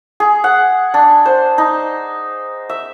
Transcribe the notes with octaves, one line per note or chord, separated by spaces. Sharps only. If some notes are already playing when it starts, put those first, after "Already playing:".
G#4
F#5
D4
C5
D#4
E5